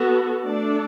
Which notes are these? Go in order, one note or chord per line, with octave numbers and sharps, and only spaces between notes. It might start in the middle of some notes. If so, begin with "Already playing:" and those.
Already playing: B3 F#4 A4
A3 D4 A4 D5